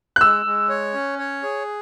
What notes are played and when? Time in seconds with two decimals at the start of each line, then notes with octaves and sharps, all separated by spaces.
0.16 F#6
0.20 G#3 E6
0.46 G#3
0.69 C#5
0.94 C#4
1.19 C#5
1.43 G#4